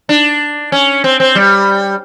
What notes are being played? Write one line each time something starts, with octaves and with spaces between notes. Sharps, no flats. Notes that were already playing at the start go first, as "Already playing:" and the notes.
D4
C#4
C4
C4
G3